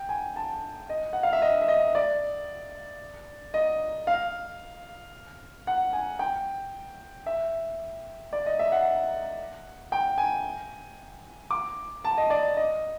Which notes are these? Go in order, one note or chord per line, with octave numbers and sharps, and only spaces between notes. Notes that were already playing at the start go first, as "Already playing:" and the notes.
Already playing: G5
G#5
A5
D#5
F#5
F5
E5
D#5
E5
D#5
D5
D#5
F5
F#5
G#5
G5
E5
D5
D#5
E5
F#5
G5
G#5
D6
A5
D#5
D5
D#5